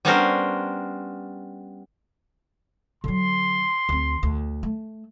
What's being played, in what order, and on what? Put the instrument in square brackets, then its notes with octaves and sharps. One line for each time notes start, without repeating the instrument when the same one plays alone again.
[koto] G3 B3 C#4 D4 A#4 C5
[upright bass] D3 F#3 [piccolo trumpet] C6
[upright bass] D2 C4
D2
A3